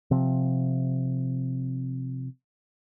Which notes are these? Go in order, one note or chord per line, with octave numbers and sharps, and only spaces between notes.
C3 F3 C4